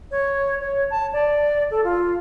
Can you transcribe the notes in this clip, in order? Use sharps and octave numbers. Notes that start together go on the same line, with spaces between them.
C#5
C#5
A5
D5
A4
F4